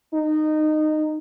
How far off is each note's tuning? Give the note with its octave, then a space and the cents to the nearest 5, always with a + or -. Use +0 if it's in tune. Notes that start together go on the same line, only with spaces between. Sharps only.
D#4 -15